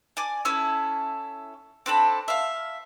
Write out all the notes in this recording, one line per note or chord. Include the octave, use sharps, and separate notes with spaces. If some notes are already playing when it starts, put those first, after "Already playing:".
D5 G#5 D6
C#4 E4 A4 E6
C4 D4 A4 B5
E5 F5